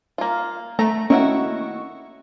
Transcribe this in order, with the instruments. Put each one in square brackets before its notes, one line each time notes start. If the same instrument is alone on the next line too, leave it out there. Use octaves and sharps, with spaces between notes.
[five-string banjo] A#3 F4
[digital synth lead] A3 [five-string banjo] A#5
[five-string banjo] D#3 E4 F#4 [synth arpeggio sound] A#3 C#4 [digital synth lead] C#6